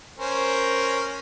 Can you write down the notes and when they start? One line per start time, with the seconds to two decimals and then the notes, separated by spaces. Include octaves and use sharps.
0.18 C#4 A#4 C5